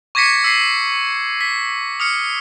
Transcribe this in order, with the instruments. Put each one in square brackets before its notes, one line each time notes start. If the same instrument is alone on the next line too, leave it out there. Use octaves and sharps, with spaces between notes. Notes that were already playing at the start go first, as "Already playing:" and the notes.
[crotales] C#6 D6 G#6 A#6 B6 C#7
E6 B6 C7
B6
D#6 F6 C#7